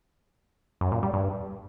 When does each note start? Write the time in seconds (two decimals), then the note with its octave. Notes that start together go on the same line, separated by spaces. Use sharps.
0.81 F#2
0.92 A#2
1.03 G3
1.14 G2